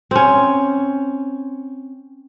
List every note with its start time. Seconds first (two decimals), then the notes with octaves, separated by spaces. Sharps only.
0.11 C4 C#4